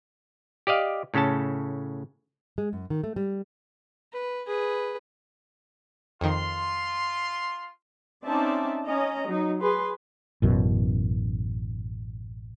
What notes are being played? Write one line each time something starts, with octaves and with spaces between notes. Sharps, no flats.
G4 D5 D#5 F5
A2 C#3 C#4 A4 A5
G#3
F#2
D#3
A3
G3
B4
G#4 B4
F2 D#3 F4 C6
C4 C#4 D#4 D5 E5 A5
C#4 D#5 A#5
F#3 D#4
G#4 B4 C6
A1 F#2 B2